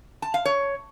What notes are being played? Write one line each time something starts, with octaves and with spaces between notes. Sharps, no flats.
A5
F5
C#5